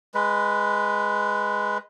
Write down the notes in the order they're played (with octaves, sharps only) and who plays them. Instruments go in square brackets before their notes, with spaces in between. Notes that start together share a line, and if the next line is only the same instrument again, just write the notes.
[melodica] G#3 B4